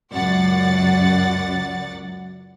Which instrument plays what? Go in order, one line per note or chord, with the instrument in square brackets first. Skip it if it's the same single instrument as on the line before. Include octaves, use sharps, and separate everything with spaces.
[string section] C#2 F#2 D5 F#5 A6